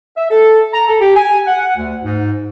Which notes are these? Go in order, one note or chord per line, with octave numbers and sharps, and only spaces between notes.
E5
A4
A#5
A4
G4
G#5
F#5
D2
G#2